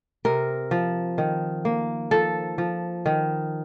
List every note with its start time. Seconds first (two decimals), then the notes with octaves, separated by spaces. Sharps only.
0.25 C3 A#4
0.71 F3
1.18 D#3
1.65 A#3
2.11 F3 A4
2.58 F3
3.06 D#3